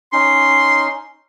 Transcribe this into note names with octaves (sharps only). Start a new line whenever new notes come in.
C#4 D#4 C6